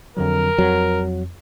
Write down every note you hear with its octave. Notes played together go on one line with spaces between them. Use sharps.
F2 D3 F#3 A#4
F2 F#3